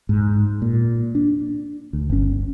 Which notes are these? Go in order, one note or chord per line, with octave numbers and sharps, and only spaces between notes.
G#2
A#2
D4
D2
G1 C#4